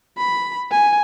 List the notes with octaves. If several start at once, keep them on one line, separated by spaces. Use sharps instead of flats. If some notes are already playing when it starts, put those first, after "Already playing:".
B5
G#5